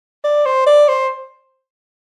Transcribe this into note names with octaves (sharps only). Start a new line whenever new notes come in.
D5
C5
D5
C5